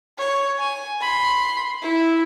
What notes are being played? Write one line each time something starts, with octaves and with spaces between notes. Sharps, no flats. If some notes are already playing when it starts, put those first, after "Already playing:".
C#5
G#5
B5 C6
E4